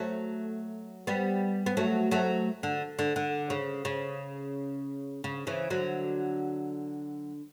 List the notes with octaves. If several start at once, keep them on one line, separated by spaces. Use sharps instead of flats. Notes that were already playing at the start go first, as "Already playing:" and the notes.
Already playing: F#3 A3
G3 B3
B3
F#3 A3
F#3 A3
D3
D3
D3
C#3
C#3
C#3
C#3 E3
D3 F#3